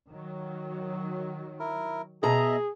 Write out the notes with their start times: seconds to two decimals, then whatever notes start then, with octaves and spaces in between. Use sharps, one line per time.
0.11 D#3 F#3
1.60 E4 A#4
2.23 B2 G#4 D#5 E5 A#5